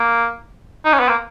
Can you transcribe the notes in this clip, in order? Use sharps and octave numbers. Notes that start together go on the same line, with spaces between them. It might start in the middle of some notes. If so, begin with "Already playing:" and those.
Already playing: A#3
D#4
C#4
B3
A#3